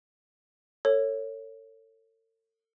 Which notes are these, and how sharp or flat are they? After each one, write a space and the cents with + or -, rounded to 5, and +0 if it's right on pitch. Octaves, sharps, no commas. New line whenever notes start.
A4 +35 C#5 -5